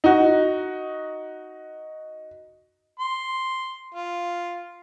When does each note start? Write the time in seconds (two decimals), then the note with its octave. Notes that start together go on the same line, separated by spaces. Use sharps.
0.04 D#4 F#4
2.99 C6
3.94 F4